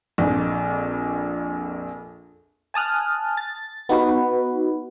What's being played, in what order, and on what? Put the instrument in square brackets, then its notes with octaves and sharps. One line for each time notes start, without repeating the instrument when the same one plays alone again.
[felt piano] A#1 F2
[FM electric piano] G#5 A5 D#6 F6 F#6
A6
B3 D#4 F#4 B4